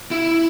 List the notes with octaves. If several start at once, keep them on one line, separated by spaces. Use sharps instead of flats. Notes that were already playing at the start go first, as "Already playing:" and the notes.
E4